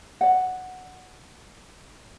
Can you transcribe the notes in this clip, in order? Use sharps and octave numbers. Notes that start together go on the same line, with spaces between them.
D5 F#5